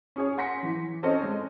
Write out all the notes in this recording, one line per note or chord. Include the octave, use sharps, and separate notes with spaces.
C#4 G#4 C#5
F#5 G#5 C6 A#6 B6 C#7
E3
C4 C#4 A4 C5 C#5 D#5
G#3